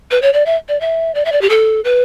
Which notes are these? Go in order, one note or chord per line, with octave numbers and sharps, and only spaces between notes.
B4
C#5
D5
E5
D5
E5
D5
E5
D5
G4
A4
B4